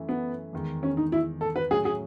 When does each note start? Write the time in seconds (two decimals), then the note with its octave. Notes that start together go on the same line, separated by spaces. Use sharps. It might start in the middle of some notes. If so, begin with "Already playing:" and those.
Already playing: F#2 E3 A3
0.09 B3
0.53 E2 D#3 G#3
0.83 C#4
0.97 D#4
1.12 E4
1.41 A4
1.56 B4
1.71 A2 F#3 C#4 G#4
1.85 G#4